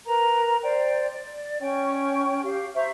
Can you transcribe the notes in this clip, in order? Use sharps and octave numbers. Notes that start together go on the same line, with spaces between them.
A#4 B4 A#5
C5 D5 G5
D5
C#4 C#5 G5 C#6
G4 F5
C5 E5 A#5 C#6